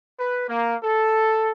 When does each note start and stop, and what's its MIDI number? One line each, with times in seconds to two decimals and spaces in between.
0.19 0.48 71
0.49 0.75 58
0.83 1.52 69